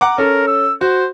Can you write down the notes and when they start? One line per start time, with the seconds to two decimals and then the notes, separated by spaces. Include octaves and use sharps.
0.01 F#5 A#5 D6
0.18 C#4 A4 A#4
0.47 E6
0.81 F#4 C5